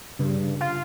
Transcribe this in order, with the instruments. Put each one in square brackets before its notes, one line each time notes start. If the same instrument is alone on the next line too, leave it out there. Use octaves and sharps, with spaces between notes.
[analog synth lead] G2 [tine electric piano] C#3
[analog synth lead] F4